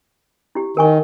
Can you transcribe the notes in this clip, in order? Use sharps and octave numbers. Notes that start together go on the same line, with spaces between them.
E4 G4
D#3 A#4 G#5 C#6